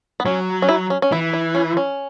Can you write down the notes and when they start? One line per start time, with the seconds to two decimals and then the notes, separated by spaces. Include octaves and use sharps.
0.20 B3
0.25 F#3 C#4
0.62 C#4
0.69 E4
0.90 C#4
1.02 C#4
1.12 E3 E4
1.33 E4
1.55 C#4
1.77 C#4